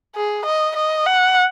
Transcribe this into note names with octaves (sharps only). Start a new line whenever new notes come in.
G#4
D#5
D#5
F#5